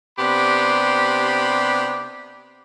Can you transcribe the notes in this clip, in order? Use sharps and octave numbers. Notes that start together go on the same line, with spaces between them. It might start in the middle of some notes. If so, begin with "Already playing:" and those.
C3 B3 D4 G4 B5 C6